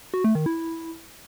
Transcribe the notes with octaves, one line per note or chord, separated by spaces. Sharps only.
F#4
A3
D#3
E4